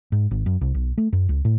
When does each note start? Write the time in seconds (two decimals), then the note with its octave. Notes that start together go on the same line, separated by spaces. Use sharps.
0.12 G#2
0.31 G#1
0.46 F#2
0.61 C2
0.74 B1
0.98 A3
1.13 F#2
1.29 C#2
1.45 A2